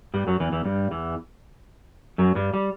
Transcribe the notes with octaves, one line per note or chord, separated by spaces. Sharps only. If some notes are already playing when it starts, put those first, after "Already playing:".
G2 G3
F#2 F#3
E2 E3
E2 E3
G2 G3
E2 E3
F#2 F#3
G2 G3
G3